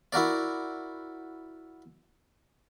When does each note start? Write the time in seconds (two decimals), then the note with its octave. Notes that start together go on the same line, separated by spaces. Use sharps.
0.13 E4 F#4 A#4 D5